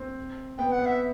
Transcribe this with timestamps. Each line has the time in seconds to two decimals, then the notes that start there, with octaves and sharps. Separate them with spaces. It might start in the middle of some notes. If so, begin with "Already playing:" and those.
Already playing: C4
0.58 B3 G5
0.72 F#5
0.79 B3
0.86 E5